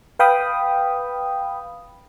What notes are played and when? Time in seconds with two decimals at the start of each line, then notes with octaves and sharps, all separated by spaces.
0.19 B4 F5 G5 B5 D#6